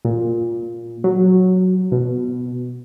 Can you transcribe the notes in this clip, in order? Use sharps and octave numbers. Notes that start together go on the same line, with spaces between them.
A#2
F#3
B2